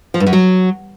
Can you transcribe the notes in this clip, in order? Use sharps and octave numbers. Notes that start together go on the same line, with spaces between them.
F3
G2
F#2
F#3